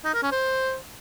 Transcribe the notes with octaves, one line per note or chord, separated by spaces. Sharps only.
D#4
A#4
C#4
C5